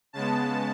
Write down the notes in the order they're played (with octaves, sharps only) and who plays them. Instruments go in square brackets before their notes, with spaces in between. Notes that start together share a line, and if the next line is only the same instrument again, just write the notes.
[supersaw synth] C#3 G#3 B3 A5